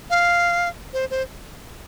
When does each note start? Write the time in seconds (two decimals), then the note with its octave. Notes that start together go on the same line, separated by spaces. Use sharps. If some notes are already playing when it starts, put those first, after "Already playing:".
0.10 F5
0.93 C5
1.10 C5